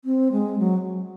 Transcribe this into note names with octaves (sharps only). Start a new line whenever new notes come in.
C4
G#3
F#3